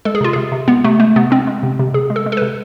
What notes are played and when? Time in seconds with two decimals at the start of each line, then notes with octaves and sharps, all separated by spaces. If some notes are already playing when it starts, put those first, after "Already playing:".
0.05 G#3 A4
0.15 G#4
0.21 C3 F4
0.33 C3 G#4
0.52 C3
0.68 G#3 B3
0.84 C3 A3
1.00 G#3 A3
1.16 C3 B3
1.31 G#3 C4
1.47 G#3
1.63 C3
1.79 C3
1.94 C3 G#4
2.10 G#3
2.16 A4
2.26 G#3
2.32 A4
2.37 C3 B4